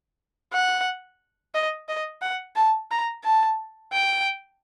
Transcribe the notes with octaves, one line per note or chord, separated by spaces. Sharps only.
F#5
D#5
D#5
F#5
A5
A#5
A5
G5